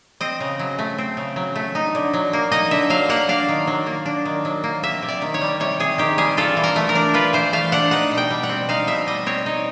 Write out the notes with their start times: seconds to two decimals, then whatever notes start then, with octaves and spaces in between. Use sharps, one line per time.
0.21 C4 D#5
0.40 C#3
0.59 F#3
0.79 A3
0.98 C4
1.17 C#3
1.36 F#3
1.56 A3
1.75 D#4
1.95 D3
2.14 F#3
2.33 A#3
2.51 D#4 D#5
2.71 D3 E5
2.90 F#3 F5
3.09 A#3 F#5
3.29 D4 F5
3.49 D#3
3.67 F#3
3.86 A#3
4.06 D4
4.25 D#3
4.45 F#3
4.64 A#3
4.83 C3 E5
5.03 C3
5.08 D5
5.22 D#3
5.34 C#5
5.41 G3
5.60 C3 C#5
5.80 C3 G#4
5.98 D#3 G4
6.18 G3 G#4
6.37 F4 A4
6.57 E3
6.64 A#4
6.76 A3
6.89 A#4
6.95 D4
7.14 F4 B4
7.33 E3 C5
7.53 A3 F5
7.72 D4 F#5
7.91 D#4 F#5
8.11 B2
8.17 G5
8.30 G3
8.43 F#5
8.49 C4
8.69 D#4 F5
8.87 B2 E5
9.07 G3 D#5
9.26 C4 C#5
9.46 D#4